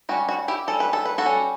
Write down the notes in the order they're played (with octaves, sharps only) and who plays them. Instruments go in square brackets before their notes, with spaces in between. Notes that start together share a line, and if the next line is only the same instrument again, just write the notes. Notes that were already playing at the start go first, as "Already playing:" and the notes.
[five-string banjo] G3 C#4 F#4
F#4
E4 G4
G3 C#4 A4
B4
A4
B4
F#4 A4
G3 C#4